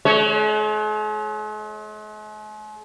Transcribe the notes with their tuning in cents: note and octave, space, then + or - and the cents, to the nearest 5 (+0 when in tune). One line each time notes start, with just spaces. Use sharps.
G#3 +45 C#5 -5